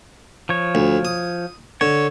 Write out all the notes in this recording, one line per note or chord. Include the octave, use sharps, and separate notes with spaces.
F3 C#5
D2
D#6
D3 C#5